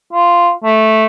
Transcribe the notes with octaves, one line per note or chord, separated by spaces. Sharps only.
F4
A3